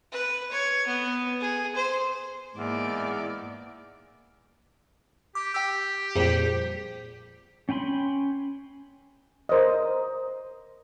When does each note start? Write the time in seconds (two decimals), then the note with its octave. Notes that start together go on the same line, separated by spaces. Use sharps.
0.12 B4
0.52 C#5
0.87 B3
1.40 G#4
1.75 C5
2.57 E2 G#2 A#3 D5
5.35 G4 D6
5.54 G4 G5 E6
6.15 F2 A#2 G3 G#4 C5
7.69 C#4 G5 G#5 B5 C6
9.49 A#4 C5 D5 D#5